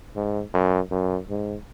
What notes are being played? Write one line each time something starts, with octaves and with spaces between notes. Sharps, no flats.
G#2
F#2
F#2
G#2